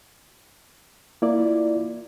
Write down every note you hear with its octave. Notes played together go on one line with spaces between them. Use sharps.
A#3 E4 F4 D5